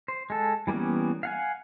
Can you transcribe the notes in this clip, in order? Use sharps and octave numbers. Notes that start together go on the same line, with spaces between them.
C5
G#3 A4
E3 G3 A#3 B3 C#4
F5 F#5 G#5